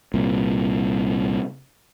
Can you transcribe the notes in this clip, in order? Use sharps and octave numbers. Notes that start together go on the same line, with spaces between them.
C2 A#2